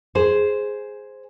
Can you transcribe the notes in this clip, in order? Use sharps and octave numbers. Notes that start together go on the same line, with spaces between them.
G#4 C5